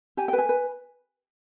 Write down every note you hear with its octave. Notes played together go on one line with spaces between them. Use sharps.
G4 G#5
G5
B4
G#5
B4